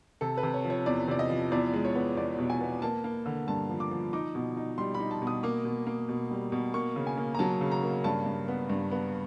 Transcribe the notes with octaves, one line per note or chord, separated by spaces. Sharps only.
C3 A4
B4
C3
C#5
F3
C#5
E2 D5
C3 D5
D#5
F3
E2 D5
G#3
C#5
B3
E2 D5
B2
G#5
B3
A#3 A5
A#3
D3
G2 A5
F3
D6
F3
D#4 D6
B2
D#4
G3 C6
B5
D#4
A5
B2
D#6
A#3 D6
B2
A#3
B2
G3
B2
A#3 C#6
C#3
G#5
A#3
A#5
F#3 A5
C#3
A#5
A#3
G2 A5
G2
B3
G2
B3